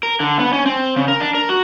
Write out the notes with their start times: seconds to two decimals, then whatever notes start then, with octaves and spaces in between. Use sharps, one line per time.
0.03 A#4
0.20 D3
0.39 B3
0.53 C#4
0.66 C4
0.96 C#3
1.08 A#4
1.20 D4
1.35 A#4
1.49 F#4